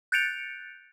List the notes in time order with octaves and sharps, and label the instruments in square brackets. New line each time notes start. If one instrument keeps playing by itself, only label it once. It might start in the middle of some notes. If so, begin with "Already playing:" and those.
[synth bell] F#6 G6 A6 C#7 D7 F7